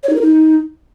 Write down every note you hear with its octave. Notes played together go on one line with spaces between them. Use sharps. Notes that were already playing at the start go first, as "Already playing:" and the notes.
C#5
D#4
A#4
D#4